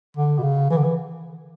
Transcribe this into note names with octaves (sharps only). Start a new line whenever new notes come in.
D3
B2
C#3
E3
D3
E3